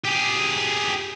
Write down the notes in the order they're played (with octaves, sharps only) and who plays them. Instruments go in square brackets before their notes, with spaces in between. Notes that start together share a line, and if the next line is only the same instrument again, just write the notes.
[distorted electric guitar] G4 G#4